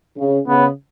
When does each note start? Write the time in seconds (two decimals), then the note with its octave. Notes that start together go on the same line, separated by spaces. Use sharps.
0.18 C#3
0.48 C#3 B3